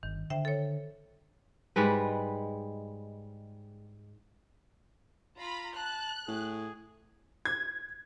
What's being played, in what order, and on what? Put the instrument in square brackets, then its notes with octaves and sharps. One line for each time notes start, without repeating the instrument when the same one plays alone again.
[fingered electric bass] G1 [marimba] D#3
[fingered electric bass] D3 [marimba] C5 E5 G5
[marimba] A4 C#5
[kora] G#2 G3 G#3 B4
[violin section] F4 A#5 B5
[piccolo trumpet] A5 [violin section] F#6
[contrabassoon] A2 [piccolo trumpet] G#4
[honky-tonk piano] G#6